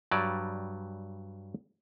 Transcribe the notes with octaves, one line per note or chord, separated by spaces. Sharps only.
G2 F#3 G3 D5